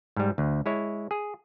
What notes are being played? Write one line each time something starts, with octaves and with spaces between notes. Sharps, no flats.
G#2 G3
D2
G#3 E4 C#5
G#4